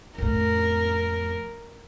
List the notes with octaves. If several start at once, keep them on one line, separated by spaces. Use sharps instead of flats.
F2 A2 A#4